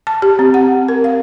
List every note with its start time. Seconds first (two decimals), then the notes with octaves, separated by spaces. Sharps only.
0.07 A5
0.22 G4
0.39 C4
0.54 F#5
0.89 A#4
1.04 F5